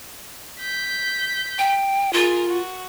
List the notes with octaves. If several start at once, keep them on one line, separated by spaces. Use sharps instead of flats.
G6 B6
G5
F4 G#4 A#4
F#4